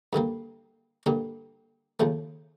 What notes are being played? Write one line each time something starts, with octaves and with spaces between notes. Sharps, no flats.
G2 D3 G3 A#3
G2 D3 G3 A#3
D#2 C#3 F3 A3